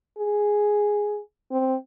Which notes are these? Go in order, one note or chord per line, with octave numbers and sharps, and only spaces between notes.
G#4
C4